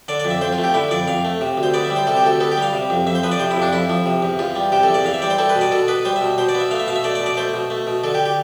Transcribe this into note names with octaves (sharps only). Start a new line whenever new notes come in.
D3 D5
D5
F2
E5
F2 C5
F4
A3
G4
D3 E4
F2 D5
F2 F5
A3
C3
D2
C5
B3 D5
E5
G3
C5
C3 A4
G4
D2 A4
B3 A4
G4
G3
F5
C3
F2
F2 E5
C5
F3 B4
D5
C3 C5
E4
F2
D4
F2 E4
F3
C3
E2
E2 F4
G3
C3 G4
A4
E2
D5
E2 F5
E5
G3 D5
C5
G3 A4
B4
B2
D5
B2 A4
B3 B4
G3 C5
E5
B2
B2 C5
D5
B3
E5
A3 F5
E5
B2 F5
E5
A3 D5
D5
B2
D5
A3 C5
B2
A3
B2
D3 A4
G4
G4